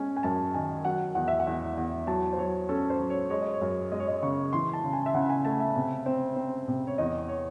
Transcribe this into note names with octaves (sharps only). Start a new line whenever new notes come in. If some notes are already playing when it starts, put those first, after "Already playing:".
Already playing: G#3 C#4 G#5
G#5
F#2 A5
D#3 G#5
F#3 F#5
E2 F#5
E5
F#5
E2
E2
F#3 A5
C5
F#3 C#5
C#4 A4
C5
F#3
C#5
G#3 C#5
D#5
C#5
F#2
G#3 D#5
C#5
D#5
C#3 C#6
E3 C6
A5
C#3
G#5
E5
C#3 F#5
G#5
A3 A5
E5
C3
C4
C4
C3
C#5
E2 D#5
C#5